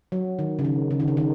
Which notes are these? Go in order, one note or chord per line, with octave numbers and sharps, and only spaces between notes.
F#3
D#3
C#3
D#3
C#3
D#3
C#3
D#3